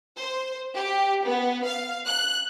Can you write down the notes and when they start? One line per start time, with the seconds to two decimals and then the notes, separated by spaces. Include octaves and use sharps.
0.17 C5
0.73 G4
1.24 B3
1.64 F5
2.06 F#6